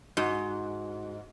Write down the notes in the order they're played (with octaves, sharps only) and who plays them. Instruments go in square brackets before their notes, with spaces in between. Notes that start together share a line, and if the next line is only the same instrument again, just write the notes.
[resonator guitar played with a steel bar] G#2 [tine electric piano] F#4